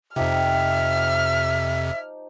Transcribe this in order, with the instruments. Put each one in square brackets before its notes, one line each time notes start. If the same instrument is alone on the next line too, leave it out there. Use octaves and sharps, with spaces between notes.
[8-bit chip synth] F2 C3 [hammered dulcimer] F3 D#4 G4 [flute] E5 [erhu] F6